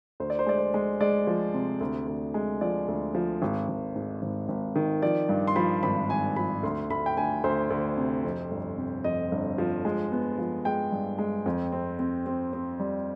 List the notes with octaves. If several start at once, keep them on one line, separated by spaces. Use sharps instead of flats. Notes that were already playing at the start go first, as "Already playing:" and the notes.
D2 C5
D5
C5
G#3 D5
C5
G#3
G#3 D5
F3
C3
D2
D2
G#3
F3 D5
D2
F3
G#1
G#1
G#2
G#1
G#1
D#3
F3 D5
G2
C6
F3 B5
G#1 B5
G#1 G#5
F3 B5
D2 C6
D2 B5
G5
D2 G#5
D2 C5
D2
C3
F2
G1
C3
F2 D#5
G1
F3
G#3
B3
F3
G#3 G5
G2
G#3
F2
C4
C4
C4
C4
G3